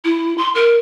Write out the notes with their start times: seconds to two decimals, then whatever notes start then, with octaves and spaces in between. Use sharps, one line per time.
0.04 E4
0.38 C6
0.55 A#4